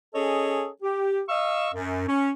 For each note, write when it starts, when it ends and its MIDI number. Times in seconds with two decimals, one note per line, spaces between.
0.13 0.67 61
0.13 0.67 68
0.13 0.67 69
0.13 0.67 73
0.13 0.67 75
0.82 1.21 67
1.28 1.69 75
1.28 1.69 77
1.28 1.69 85
1.28 1.69 88
1.74 2.02 42
2.08 2.31 61